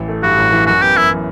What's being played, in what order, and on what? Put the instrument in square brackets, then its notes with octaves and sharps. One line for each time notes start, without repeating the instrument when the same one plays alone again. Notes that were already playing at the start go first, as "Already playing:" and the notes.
Already playing: [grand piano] A1 E3
A3
[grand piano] G2 [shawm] F#4
[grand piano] A1
E3
[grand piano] F#2 [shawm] F#4
[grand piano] B3 [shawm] G4
[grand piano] F#2 [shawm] E4
[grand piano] E3